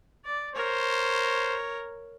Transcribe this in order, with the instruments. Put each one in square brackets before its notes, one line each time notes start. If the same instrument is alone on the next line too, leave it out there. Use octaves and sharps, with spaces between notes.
[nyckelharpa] D5
[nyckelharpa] A#4 C#5 [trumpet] C5